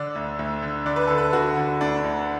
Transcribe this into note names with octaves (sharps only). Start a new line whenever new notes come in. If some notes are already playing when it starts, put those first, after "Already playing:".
Already playing: D3 D5
D2
D2
D3
D3 D5
B4
D3 A4
B4
D3 F#4
D3
D2 D4
D2